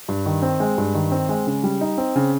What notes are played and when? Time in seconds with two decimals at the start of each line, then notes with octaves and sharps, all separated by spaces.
0.09 G2
0.26 D#3
0.42 C4
0.60 G#3
0.78 G2
0.95 D#3
1.11 C4
1.29 G#3
1.47 C#3
1.64 G3
1.81 D#4
1.98 C4
2.16 C#3